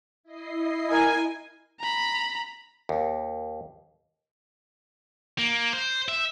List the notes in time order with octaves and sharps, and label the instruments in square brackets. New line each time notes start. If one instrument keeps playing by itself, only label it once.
[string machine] E4 D#5 C7
[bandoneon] A#4 [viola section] G#5
[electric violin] A#5 B5
[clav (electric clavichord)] D#2
[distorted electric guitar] A#3
C5
E5